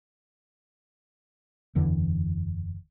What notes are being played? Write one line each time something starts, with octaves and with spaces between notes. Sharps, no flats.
F#1 E2 D3 E3